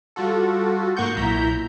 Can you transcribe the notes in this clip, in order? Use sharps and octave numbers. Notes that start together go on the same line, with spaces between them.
G3 F4 F#4 A4
G#2 A#3 F#5 C#6 G6
B1 A#2 E4 A#5 G6 B6